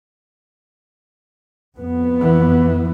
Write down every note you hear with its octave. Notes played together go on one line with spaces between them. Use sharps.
F2 B3
E3